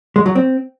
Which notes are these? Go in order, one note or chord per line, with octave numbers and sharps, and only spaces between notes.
G#3
F#3
C4